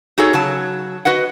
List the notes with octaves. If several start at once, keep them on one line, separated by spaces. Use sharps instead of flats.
D#4 F#4 G#4 A4 C#5
C#3 F#3 A5
F#4 B4 D#5 F#5